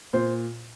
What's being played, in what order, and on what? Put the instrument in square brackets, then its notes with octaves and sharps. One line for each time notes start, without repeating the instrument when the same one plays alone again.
[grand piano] A#2 C5